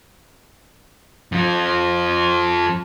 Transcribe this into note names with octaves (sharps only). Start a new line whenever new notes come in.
F2 F3